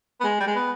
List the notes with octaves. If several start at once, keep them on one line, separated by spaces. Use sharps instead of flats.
B3
G#3
G3
G#3
B3